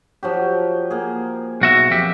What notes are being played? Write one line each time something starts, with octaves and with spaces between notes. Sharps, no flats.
F3 F#3 G4
A#3 G#4
B1 F#4 E5
F2 G4 E5